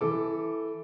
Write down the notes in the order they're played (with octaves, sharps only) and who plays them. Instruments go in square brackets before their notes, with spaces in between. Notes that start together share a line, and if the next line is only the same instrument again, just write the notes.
[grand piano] E3 A4 D6